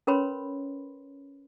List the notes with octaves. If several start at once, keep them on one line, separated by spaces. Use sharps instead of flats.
C#4 A#4 B4 C#5 B5 C6